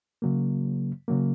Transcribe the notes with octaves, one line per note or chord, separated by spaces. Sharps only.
C#3 F#3 A#3
C#3 F#3 A#3